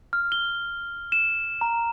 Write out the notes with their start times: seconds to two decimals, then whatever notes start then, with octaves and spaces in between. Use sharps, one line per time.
0.13 F6
0.32 G7
1.12 E7
1.61 A#5